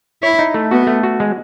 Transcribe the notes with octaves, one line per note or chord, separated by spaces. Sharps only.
E4 C#5
D#4
A3
B3 F#4
A3
F#4
G#3